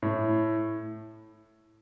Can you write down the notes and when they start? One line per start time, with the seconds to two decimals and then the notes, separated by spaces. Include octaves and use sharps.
0.02 A2